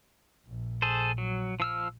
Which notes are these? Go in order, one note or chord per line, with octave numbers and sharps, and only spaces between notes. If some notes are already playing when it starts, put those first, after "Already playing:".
A#1
G#4 A4 C5
F#3
F3 E6 F6